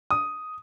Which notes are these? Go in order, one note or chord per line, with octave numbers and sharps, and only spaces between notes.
D#6